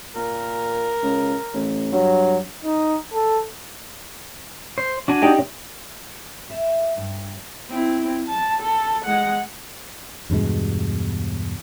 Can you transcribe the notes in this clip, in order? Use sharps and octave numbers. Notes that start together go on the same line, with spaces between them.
A#2 A#4
C#2
A1
G2 F#3
D#4
A4
C5
D4 F#4 G#5
D#4 G4 D5
E5
G2
C4 E4
A5
A4
G#3 F#5
E2 G2 B2 G#3